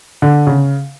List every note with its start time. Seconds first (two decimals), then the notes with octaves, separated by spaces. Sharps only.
0.22 D3
0.47 C#3